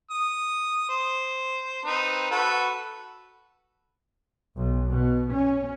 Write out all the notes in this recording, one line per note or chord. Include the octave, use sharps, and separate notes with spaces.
D#6
C5
C4 D#4 B4
F#4 A4 B4
B1
B2
C#4